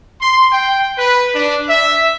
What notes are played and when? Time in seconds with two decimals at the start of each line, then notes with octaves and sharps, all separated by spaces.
0.20 C6
0.51 G5
0.97 B4
1.34 D4
1.68 E5